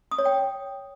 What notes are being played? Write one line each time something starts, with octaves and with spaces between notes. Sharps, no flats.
D#6
C#5
G5